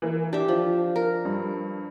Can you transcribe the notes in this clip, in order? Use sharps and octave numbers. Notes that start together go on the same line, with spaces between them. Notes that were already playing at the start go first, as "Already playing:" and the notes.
E3 A#3
D4 G4 E5
F3
A#4
G2